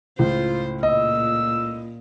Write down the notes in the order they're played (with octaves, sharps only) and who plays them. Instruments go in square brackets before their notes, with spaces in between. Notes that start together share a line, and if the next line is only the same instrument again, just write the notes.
[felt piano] C#2 A2 [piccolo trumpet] F4 [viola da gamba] C5
[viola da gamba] A#2 [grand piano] D#5 [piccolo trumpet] E6